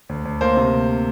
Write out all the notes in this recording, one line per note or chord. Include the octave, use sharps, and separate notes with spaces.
D2
D2
A#3 C5
C3